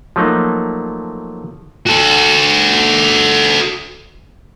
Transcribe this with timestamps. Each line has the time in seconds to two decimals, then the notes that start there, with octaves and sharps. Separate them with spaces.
0.16 F3 F#3 A3 A#3 D#4
1.86 F#4 A4